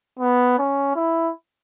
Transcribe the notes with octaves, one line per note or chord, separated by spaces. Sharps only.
B3
C#4
E4